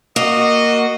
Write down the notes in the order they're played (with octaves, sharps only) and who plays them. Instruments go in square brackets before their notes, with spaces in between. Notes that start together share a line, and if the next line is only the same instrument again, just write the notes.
[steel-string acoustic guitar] A#3 [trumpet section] F#4 D#5